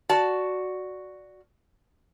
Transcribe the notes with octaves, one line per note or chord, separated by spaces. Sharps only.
F#4 D5 A5